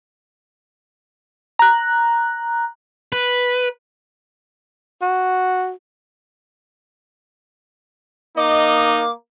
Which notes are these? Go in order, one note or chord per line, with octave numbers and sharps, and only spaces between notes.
A#5 F#6
B4
F#4
A#3 D#4 D#5 D6